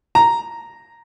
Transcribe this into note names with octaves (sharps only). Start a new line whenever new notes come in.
A#5